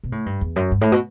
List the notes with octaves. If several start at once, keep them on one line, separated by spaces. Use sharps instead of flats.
B2
A2
G2
E2
F#2
G2
A2
B2